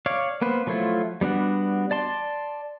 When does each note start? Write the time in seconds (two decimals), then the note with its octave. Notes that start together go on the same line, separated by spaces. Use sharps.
0.06 C#5 D5 F5
0.41 A#3 B3 B4 C5
0.67 F3 F#3 A3 E4 F4
1.21 G3 B3 D4 F#4
1.91 D5 A5 C6